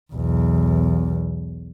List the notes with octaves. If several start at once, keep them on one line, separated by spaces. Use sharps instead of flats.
B1 E2